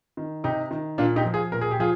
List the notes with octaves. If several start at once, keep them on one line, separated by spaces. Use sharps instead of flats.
D#3
C3 D#4 G4
D#3
A#2 D4 F4
D#4 G4
F3
F4 G#4
A#2 A#4
G#4
G4
F3 F4 G#4